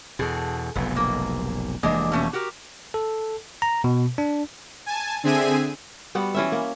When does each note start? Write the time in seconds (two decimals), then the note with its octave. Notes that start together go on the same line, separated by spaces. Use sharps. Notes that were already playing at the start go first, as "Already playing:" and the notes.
0.19 E2 B2 G#4 A4
0.75 F1 B1 G#2 B3
0.96 A#3
1.83 F1 E3 G#3 A#3 D4 D#5
2.12 B2 A3 C#4
2.33 F#4 G4 A#4
2.94 A4
3.62 A#5
3.84 B2
4.18 D4
4.86 G#5 A5
5.23 D3 C4 G#4 E5 G#5 D#7
6.15 G3 B3 F#4
6.35 E3 C#4 E5
6.52 A#3